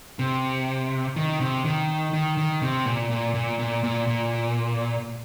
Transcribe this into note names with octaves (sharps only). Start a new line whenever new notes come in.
C3
D#3
C3
D#3
D#3
D#3
C3
A#2
A#2
A#2
A#2
A#2
A#2